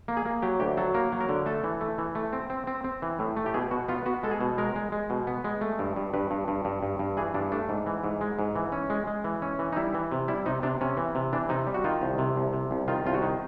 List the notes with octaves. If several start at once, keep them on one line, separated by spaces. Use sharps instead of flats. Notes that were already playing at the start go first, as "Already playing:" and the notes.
A#3
G#4
A#3
F#3 G4
D2 G4
F#3 A4
A#3 A#4
F#3
A#4
D3
A3 A4
E3
A3
E3
A3
C4
C4
C4
C4
E3
A2
A3
G4
B2 G#4
B2 F#4
B3 F4
B3 F#4
G#3 A4
G#4
B2
G#3 A#4
G#3
G#3
B2
B3
G#3
A3
G2
G2
G2 B4
G2
G2
G2
G2
G2
E3 G#4
G2 D4
A3 D4
G#2
E3
G#2
G#3
G#2
E3
C#4
G#3
G#3
E3
C#4
E3
D#4
G3 E4
E3
C3
G3 E4
C3 D#4
C3 D4
C3 C#4
E3
C3
E3 D4
C3 D#4
G3
F#4
D#3 F4
C2
C3
C2
C3
C2
D#3 F4
C2 F4
F#4
D#3